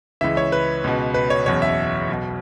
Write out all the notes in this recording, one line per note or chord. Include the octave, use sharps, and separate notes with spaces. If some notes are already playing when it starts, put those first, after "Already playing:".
C#2 C#3 E3 E5
C#5
B4
C#2 B2
B4
C#5
F#1 E2 B2 C#5
E5
B1 B2